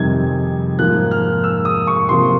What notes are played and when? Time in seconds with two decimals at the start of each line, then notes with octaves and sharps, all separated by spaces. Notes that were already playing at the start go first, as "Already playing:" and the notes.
Already playing: F2 C3 D#3 G3 G#6
0.79 G#2 F3 A#3 F#6
1.11 F6
1.44 E6
1.65 D#6
1.87 C#6
2.09 C3 F3 A#3 C6